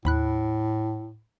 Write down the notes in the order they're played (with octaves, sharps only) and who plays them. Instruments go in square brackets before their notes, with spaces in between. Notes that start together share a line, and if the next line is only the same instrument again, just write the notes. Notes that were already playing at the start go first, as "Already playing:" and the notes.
[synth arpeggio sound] D#2 B5 F#6 [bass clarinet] A2